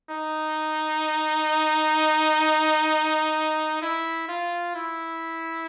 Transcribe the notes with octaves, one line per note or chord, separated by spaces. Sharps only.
D#4
E4
F4
E4